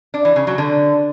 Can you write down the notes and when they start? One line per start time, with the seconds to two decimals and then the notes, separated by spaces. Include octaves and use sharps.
0.14 D4
0.25 E3
0.36 C#3
0.47 F#3
0.58 D3